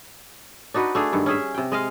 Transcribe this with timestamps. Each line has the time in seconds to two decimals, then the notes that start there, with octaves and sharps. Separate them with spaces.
0.74 D4 D#4 F#4 B4
0.95 A3 D4 G#4
1.13 G2 D#3
1.26 C#4 G#4 E5
1.54 C3 G5
1.72 G#3 D#5 F5